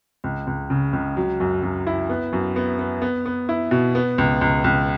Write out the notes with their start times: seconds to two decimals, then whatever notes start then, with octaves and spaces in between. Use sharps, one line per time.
0.24 C#2
0.47 C#2
0.70 C#3
0.93 C#2
1.17 F#3
1.40 F#2
1.63 F#2
1.87 E4
2.09 B3
2.33 F#2
2.56 B3
2.79 B3
3.02 B3
3.26 B3
3.49 E4
3.71 B2
3.95 B3
4.18 C#2
4.41 C#2
4.64 C#2